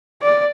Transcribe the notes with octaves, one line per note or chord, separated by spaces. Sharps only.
D5